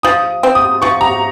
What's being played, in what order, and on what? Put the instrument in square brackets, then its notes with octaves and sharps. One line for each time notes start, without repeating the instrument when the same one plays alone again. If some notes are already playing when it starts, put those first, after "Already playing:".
[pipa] F3 [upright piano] D#6
[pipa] C4
[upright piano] D#6
[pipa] F3 [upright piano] C#6
[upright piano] A#5